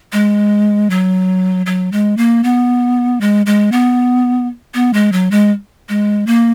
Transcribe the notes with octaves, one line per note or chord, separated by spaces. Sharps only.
G#3
F#3
F#3
G#3
A#3
B3
G#3
G#3
B3
B3
G#3
F#3
G#3
G#3
A#3